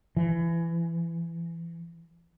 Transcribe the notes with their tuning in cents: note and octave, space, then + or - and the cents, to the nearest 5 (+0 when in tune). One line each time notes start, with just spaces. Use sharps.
E3 +25